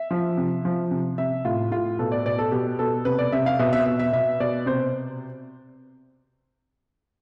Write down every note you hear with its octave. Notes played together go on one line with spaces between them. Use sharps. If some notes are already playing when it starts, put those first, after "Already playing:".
Already playing: E5
F3
C3
F3
C3
C3 E5
A2 F4
A2 F4
B2 A4
D5
B2 D5
A4
B2 G4
B2 A4
C3 B4
D5
C3 E5
F5
B2 E5
E5
B2 E5
E5
B2 E5
B2 D5
C3 C5